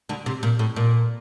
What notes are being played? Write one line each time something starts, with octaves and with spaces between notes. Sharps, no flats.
D2 D3
C3
A#2
A2
A#2